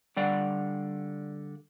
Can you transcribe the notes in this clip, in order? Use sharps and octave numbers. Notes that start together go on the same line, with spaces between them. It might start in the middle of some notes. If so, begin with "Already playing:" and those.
D3 G3 D5 F5 F#5